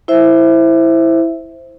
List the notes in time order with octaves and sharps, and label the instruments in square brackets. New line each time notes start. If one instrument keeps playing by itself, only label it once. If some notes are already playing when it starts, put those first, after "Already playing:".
[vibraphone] E4 C5 E5